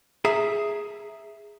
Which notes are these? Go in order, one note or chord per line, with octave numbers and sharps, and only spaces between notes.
G#4 E5 A#5